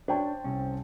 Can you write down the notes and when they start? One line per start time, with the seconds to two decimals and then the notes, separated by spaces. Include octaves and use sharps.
0.08 D4 C5 C#5 G5 A5
0.44 C2 C#4